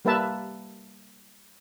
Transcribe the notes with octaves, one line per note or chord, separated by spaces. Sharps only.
G3 A#3 A#4 B4 E5 A5